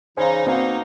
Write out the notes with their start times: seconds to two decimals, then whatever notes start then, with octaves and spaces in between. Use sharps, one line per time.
0.17 C#3 E3 D#4 C5 D5 F5 G#5 B5
0.47 B2 A#3 C4 D#4 A#4 F5 A#5